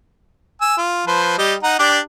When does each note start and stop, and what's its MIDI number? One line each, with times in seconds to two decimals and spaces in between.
0.61 0.77 80
0.61 0.77 88
0.77 1.05 65
1.07 1.38 53
1.07 1.38 71
1.07 1.38 72
1.38 1.54 55
1.38 1.54 67
1.38 1.54 75
1.63 1.75 63
1.63 1.75 78
1.63 1.75 82
1.79 1.99 62
1.79 1.99 67
1.79 1.99 74